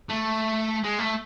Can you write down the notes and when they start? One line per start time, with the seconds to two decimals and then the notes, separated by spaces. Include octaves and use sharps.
0.09 A3
0.84 G#3
0.99 A3